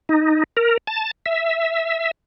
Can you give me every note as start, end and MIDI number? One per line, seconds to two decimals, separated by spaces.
0.09 0.44 63
0.57 0.77 70
0.87 1.11 81
1.26 2.11 76